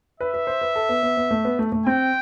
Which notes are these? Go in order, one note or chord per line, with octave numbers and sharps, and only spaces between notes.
B4 E5
B4
C5
B4
A4
B3
B3
B3
A3
B3
A3
A3
C4 G5